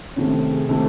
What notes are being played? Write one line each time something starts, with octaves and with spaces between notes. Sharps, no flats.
C3 D#3 A3 C#4
G#4
C3 D#3 A3 A4